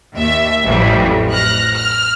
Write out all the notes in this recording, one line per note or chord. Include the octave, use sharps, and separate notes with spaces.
D#2 E5
A1 F2 E3 F#3 G3
F6 F#6 A#6
F6